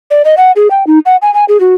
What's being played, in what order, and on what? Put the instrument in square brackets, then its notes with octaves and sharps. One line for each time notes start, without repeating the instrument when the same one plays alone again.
[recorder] D5
D#5
F#5
G#4
G5
D#4
F#5
G#5
G#5
G#4
F#4